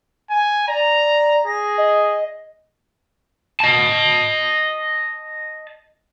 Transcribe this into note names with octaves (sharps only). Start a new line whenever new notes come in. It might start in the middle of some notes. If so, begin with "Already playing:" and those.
G#5
D5 A#5
G#4 A#6
D#5
D#5 A5